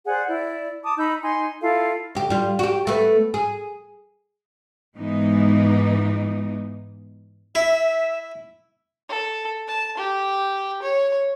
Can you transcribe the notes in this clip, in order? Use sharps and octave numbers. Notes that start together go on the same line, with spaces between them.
G#4 C5 D5 F#5
E4 D5
A5 D6 D#6
D#4 B5 E6 G6
D#4 G#5 C6
E4 F4 A4 F5
D2 G4
G3 F4
F#4 G4
A3 B3
G#4
G#2 E3 G#3 B3 D#4
E4 E5
A4
A5
G4
C#5